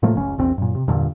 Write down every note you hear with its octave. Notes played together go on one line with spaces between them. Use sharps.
A2 F3 A3 A#3
F#1 C#2 C#3 C#4
A#1 E2 C4
F#2 A#2
C3
E2 G2 A#2 D3